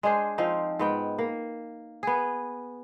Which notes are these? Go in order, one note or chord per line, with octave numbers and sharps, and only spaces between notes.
G#3 D4 G#4 C5
F3 C4 D#4
G#2 B3 G5
A#3
B3 G#4